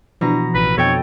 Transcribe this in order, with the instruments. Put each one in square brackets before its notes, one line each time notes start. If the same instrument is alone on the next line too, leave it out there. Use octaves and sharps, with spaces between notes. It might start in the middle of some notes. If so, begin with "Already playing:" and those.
[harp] B2 A#5 [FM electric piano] E3 F3 D4
[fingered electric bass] A1 [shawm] B4
[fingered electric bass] F2 B2 [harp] A4 D#5 G5 [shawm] C#5